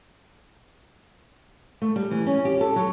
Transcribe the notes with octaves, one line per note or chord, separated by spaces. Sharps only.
A3
G3
E3
C#4
G4
A4
F#3